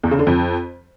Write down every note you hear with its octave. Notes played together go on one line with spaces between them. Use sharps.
E2
C#3
D3
F2